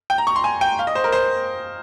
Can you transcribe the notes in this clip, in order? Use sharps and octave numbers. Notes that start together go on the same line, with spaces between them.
G5
A#5
C#6
C6
G#5
G5
F5
D#5
C5
A#4
C5